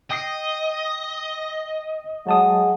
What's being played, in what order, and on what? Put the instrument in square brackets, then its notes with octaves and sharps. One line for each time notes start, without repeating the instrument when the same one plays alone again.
[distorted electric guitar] D#5 [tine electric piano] G5 D#6 C7
[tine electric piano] F#3 A5 D#6 [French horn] G#3 [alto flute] F#5